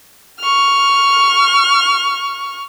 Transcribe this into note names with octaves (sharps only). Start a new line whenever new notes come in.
C#6 F6